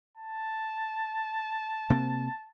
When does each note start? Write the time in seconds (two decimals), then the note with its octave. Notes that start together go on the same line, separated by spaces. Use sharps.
0.18 A5
1.90 C3 A#3 C4